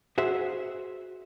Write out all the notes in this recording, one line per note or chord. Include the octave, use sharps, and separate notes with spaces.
F#4 G#4 C5 E5